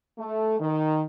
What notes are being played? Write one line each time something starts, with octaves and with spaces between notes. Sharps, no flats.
A3
D#3